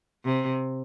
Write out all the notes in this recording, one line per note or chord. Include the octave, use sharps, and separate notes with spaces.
C3